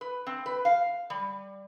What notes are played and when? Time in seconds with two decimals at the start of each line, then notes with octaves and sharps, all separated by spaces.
0.01 B4
0.26 C4
0.46 B4
0.65 F5
1.10 G3